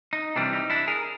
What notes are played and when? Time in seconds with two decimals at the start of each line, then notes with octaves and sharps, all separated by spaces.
0.13 D#4
0.36 C3 E3 G3 C4 D4
0.53 D#4
0.70 D4 E4
0.87 G#4 A#4